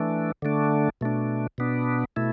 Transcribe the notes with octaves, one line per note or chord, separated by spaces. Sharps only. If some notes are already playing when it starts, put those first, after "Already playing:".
Already playing: E3 A3 D4
D3 A3 D4
B2 A3 D4
B2 B3 D4
B2 A3 E4